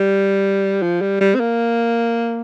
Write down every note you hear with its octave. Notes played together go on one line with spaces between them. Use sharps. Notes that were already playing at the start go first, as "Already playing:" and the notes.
Already playing: G3
F3
G3
G3
C4
A#3